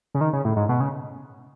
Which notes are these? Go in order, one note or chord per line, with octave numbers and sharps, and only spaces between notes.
C#3
D#3
C#3
A2
G#2
B2
C#3